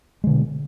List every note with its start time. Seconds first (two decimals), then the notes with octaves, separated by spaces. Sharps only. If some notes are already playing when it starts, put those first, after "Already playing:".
0.24 G#3
0.27 D3
0.30 B2